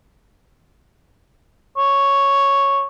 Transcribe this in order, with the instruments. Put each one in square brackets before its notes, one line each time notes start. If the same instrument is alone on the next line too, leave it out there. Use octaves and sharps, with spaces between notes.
[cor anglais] C#5